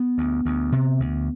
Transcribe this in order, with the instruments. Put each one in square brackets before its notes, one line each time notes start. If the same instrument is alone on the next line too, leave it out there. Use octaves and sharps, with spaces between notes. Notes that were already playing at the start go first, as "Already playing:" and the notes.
Already playing: [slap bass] B3
D2
D2
C3
D2